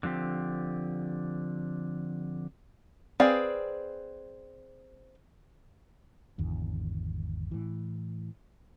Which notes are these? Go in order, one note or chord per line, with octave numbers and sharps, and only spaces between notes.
D3 F3 C4 G4
C4 G#4 B4 D5 F5
G#1 E2 D3
A2 E3